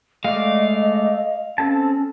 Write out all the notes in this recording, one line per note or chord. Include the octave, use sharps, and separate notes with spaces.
G#3 A3 D5 D#5 F5
C4 C#4 A4 A5